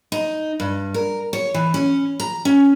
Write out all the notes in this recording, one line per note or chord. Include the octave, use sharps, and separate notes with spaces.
D#4
G2
A#4
C#5
E3
C#4
A#5
C#4